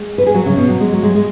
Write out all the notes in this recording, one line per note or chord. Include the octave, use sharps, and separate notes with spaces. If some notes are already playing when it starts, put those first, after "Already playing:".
Already playing: G#3
B4
G#4
F#3 F#4
C#3 C#4
B2 B3
F#3
G#3
F#3
G#3
G#3